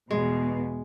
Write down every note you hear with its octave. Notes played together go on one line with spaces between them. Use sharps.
E2 B2 G#3